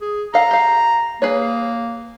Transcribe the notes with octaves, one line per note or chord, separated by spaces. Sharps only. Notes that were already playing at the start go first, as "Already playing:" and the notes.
G#4
A4 F5 F#5 A#5
G4 F5
A#3 G#4 B4 C#5